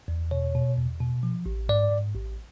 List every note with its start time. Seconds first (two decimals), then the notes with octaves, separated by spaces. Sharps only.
0.08 E2
0.31 B2 C#5
0.55 B2
0.77 E2
1.00 B2
1.23 F3
1.46 A1
1.69 G#2 D5
1.92 G#2
2.15 A1